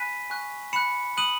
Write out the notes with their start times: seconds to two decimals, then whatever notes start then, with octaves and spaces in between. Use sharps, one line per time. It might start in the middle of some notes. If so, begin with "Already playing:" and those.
Already playing: G#5 B5 F#6 B6 D#7
0.30 G#5 C#6 F#6
0.73 B5 F#6 C#7 E7
1.17 B5 D#6 F#6 D#7 F#7